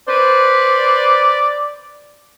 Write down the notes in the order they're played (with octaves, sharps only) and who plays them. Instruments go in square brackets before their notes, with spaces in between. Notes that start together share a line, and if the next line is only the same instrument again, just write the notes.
[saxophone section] B4 C5 [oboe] D5